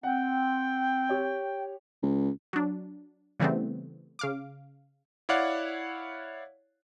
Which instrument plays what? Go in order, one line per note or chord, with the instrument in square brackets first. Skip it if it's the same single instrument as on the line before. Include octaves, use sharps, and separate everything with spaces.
[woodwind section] C4 [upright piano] F#5 [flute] G5
[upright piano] G4 C#5
[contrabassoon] C#2
[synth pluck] F#3 D4
C#3 E3 G3 A3 B3 C4
C#3 F5 D6
[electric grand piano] E4 C#5 D5 F5 F#5